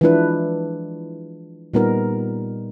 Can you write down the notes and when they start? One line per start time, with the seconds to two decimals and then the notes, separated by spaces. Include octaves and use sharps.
0.01 E3 F3 G#3 D4 E4 B4
1.74 A#2 G3 B3 D#4 A#4